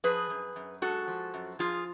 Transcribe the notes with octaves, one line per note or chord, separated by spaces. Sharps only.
F3 G#4 B4
F#2
F#2
G#3 F#4 A4
F3
F#2
F3 F4 G#4